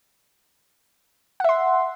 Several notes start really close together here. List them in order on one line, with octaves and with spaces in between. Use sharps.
F#5 E5 C6